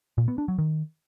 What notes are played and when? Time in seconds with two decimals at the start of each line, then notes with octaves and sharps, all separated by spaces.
0.18 A#2
0.28 B3
0.38 D4
0.48 F#3
0.58 D#3